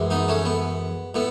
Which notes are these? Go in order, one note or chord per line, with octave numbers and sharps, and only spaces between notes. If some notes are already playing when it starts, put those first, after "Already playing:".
Already playing: F#2 E3 G#3
B3 D#4
A3 C#4
B3
A2 B3